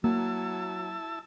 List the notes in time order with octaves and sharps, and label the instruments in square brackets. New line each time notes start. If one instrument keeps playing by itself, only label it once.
[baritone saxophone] F#3 [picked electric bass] A#3 [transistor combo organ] E4 A5 E6